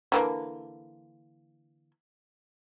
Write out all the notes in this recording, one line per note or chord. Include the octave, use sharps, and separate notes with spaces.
D3 E3 A#3